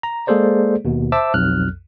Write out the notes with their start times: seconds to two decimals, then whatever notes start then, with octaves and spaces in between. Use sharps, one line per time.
0.03 A#5
0.27 G#3 A#3 G#4 A4 C5 D5
0.85 D#2 B2
1.12 C5 E5 A5 D6 E6
1.34 B1 F2 F6 F#6